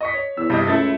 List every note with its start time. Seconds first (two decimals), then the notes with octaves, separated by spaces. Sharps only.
0.01 D#5 C#6 B6
0.14 C#5
0.37 E2 E6
0.50 G2 C3 G3 D#5
0.67 C#2 A3 E4 A4 A6